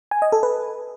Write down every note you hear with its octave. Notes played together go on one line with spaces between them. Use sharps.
G#5
D#5
A4
B4